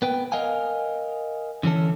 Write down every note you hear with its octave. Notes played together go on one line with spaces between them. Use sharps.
B3 B4 G5
A#4 D#5 F5 F#5 G#5
D3 E3 C#4 A4